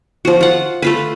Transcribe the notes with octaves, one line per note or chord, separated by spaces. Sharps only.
F3 F#4
F4 F#5
A3 F4 B4